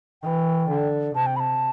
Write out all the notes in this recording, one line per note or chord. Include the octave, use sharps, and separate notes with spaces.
E3 G5
D3
C3 A5
G5
B5
A5